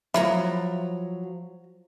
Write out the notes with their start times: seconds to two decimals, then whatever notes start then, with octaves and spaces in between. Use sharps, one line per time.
0.14 F3 F#3 E4 A#5